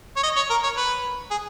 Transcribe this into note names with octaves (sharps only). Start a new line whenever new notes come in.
C#5
D#5
C#5
A#4
C#5
B4
G#4